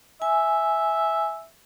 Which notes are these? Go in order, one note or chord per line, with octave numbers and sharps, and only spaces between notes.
E5 G#5